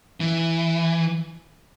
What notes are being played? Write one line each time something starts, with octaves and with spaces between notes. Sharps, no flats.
E3